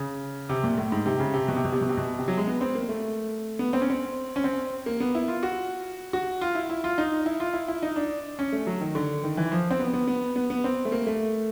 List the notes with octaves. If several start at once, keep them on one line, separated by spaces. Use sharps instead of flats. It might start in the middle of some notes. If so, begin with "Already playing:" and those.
Already playing: C#3
C3
A#2
A2
G#2
C3
C#3
C3
B2
C3
B2
C3
B2
C3
B2
C3
F#3
G#3
B3
C4
A#3
A3
B3
C4
C#4
C4
C#4
C4
A#3
B3
E4
F4
F#4
F#4
F4
E4
E4
F4
D#4
E4
F4
E4
E4
D#4
D4
C#4
A3
F#3
D#3
D3
D#3
E3
F3
C4
B3
B3
B3
B3
B3
C4
A3
A#3
A3